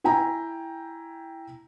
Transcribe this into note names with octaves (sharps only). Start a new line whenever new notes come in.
E4 G5 G#5 A#5